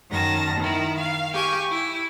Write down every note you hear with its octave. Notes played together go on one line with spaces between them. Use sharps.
F#2 D#3 A5 A#6
D#3 E4
F5
G4 G#5 C#6
E4